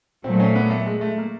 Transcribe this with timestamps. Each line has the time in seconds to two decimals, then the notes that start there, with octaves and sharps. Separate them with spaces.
0.24 A#2 F#3 A3 C4
0.40 C#4
0.55 B3
0.71 A3
0.86 G#3
1.01 A3
1.18 A#3